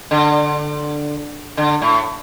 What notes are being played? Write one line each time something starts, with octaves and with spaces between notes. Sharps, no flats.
D3
D3
A2